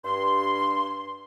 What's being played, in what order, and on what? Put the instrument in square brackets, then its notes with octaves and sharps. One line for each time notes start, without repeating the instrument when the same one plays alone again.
[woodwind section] G2 C6